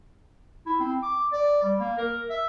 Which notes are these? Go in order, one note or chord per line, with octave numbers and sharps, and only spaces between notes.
E4
C4
D6
D5
G3
A#3
A#4
E5